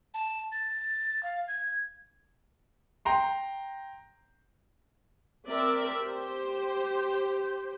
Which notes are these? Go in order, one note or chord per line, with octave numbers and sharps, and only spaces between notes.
A5
A6
F5
G#6
G5 A#5 C6
C4 A#4 D5 E5
G4 C5